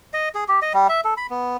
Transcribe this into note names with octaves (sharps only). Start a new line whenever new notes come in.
D#5
G#4
G4
D#5
G3
E5
A4
B5
B3